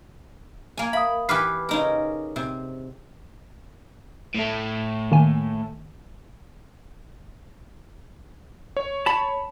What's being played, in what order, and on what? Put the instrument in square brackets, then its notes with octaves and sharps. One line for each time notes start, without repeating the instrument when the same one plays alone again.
[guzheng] A#3 G#5
[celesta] E5 F5 D#6 [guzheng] B5
[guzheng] E3 G4 B4 [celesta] D6 F6 C7
[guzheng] C#3 D#4 A#4
C3
[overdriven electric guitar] A2 A3
[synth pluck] D#3 A#3 G#5
[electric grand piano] C#5
[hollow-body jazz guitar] A5 B5